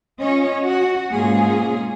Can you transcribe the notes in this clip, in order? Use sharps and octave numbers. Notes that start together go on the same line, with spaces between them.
C#4 F4 C#5 D#5
F#4
G#2 B2 A#3 C#4 F4 G#4